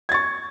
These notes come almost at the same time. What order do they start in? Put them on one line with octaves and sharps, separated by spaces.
G#6 A6 C#6